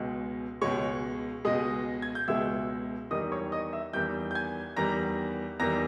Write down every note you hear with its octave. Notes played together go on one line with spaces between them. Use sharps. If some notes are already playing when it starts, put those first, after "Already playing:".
Already playing: C#2 B2 G#3
C#2 B2 G#3 C#5 C#6
C#2 B2 G#3 D#5 D#6
G#6
G6
C#2 B2 G#3 E5 E6
E2 D#3 G3 D#5 D#6
C#5 C#6
D#5 D#6
E5 E6
E2 D#3 G3 G5 G6
G6
G#5 G#6
E2 D#3 G3 A#5 A#6
E2 D#3 G3 A#5 A#6